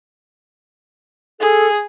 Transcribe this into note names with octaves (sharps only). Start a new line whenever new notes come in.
G#4 A4